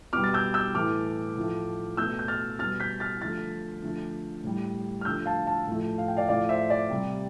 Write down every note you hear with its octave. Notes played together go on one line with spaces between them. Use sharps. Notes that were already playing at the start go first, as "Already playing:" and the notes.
B2 G3 D6 F6
A6
E6 G6
E6 G6
A2 E3 A3 D6 F6
A2 F3 A3
B2 A3 E6 G6
G6
F6 A6
B2 G3 F6 A6
G6 B6
F6 A6
D3 F3 A3 F6 A6
D3 F3 A3
A2 G3
F6
D3 F3 A3 E6 G6
F5 A5
F5 A5
A2 F3 A3
F5
G5
D5 F5
A2 F3 A3 D5 F5
C5 E5
D5
C3 G3